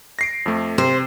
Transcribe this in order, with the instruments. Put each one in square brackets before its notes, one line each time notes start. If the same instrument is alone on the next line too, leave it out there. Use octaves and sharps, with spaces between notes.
[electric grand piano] A#6 C7 D7
F2 A3
[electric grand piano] C3 [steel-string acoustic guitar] C5